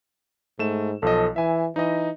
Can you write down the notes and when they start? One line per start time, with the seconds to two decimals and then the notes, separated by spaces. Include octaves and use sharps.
0.59 G#2 A3 E7
1.02 B1 F3 A4 D#5
1.36 E3 E5 G#5
1.76 E3 D#4 D#5